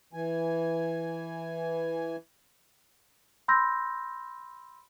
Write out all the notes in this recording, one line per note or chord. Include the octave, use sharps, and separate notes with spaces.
E3 G#5
B5 C6 E6 G6 A#6